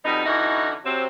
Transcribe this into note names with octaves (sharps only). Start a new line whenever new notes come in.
F2 B2 G3 B3 D#4
D3 E3 C#4 D#4 E4 F#4
C3 F#3 C4